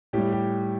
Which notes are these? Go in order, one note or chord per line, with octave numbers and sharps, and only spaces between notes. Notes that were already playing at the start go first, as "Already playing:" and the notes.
A2 G3 G4
G4